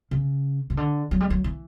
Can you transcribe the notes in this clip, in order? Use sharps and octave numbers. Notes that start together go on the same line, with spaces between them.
C#3
C#3
D3
F#3
G3
F#3
E3